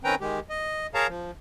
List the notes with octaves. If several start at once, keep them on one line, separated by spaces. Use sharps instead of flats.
D#3 C4 C#4 B4 G5 A#5
D#3 G#3 G4
D#5
G#4 A#4 C#5 F5 A5 A#5
F3